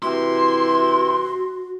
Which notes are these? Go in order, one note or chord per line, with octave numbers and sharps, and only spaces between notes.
C3 E3 E4 F#4 C6